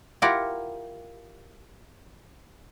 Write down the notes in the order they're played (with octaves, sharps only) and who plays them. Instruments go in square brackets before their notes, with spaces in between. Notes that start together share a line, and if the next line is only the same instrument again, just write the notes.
[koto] E4 F4 G4 A#4 F#5